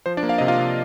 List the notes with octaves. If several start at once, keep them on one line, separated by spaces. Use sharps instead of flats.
F3 C5
D4 D5
A#3
F5
C3 D#5
F4 F5
C3